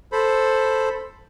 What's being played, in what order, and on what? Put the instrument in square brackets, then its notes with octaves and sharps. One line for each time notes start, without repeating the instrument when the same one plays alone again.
[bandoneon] A4 C5 B5